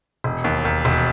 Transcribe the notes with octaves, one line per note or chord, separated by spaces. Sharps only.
E1
D#2
D#2
E1